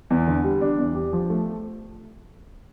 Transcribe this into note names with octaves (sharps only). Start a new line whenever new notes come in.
E2
D3
G3
D4
E2
G4
F3
A3